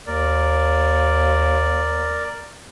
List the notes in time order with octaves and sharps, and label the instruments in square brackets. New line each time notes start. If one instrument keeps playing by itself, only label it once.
[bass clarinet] D#2 [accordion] A#4 D5